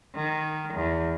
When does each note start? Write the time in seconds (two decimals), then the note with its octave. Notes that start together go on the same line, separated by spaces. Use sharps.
0.16 D#3
0.74 E2